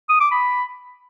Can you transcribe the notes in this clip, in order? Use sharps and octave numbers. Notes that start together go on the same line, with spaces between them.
D#6
D6
B5